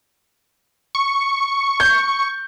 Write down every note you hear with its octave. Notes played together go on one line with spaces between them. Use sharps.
C#6
G6